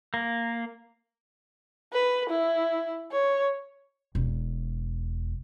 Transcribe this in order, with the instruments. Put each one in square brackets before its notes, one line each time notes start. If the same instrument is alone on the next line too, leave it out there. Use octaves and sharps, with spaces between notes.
[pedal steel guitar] A#3
[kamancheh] B4
E4
C#5
[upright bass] E1